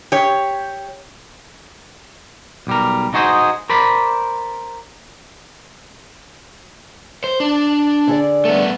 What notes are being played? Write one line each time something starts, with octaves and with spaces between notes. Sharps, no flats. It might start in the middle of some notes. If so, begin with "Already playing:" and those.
G4 C#5
B1 G3 A#4
D#4 F#4 G#4 C5 D#5
A#4 C5 D5 B5
C5
D4
D3 G#4 D5
A3 B3